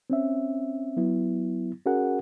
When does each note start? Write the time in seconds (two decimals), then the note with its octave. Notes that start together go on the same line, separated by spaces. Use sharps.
0.10 C4 C#4 E5
0.97 F#3 B3 E4
1.85 C#4 F#4 G#4 A#4 F#5